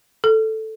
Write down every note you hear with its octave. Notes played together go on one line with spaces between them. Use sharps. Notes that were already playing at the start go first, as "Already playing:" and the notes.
A4